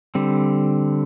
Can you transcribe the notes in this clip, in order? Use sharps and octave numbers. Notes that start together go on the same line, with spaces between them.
D3 G3 C4